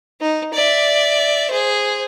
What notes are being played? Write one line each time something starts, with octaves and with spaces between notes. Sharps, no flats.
D#4
D5 E5
G#4 C5